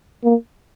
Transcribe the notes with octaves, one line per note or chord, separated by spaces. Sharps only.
A#3